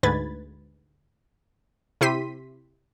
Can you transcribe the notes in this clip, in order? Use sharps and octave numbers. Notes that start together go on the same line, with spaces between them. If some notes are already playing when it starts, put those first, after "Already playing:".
D2 G#2 B4 B5 G#6 A6
C3 E4 G4 C6 B6 D#7